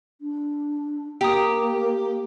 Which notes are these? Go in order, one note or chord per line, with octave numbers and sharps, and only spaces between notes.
D4
A#3 G4 G5 A#5 D#6